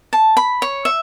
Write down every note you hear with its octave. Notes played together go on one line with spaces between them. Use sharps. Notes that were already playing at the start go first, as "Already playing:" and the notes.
A5
B5
C#5
E5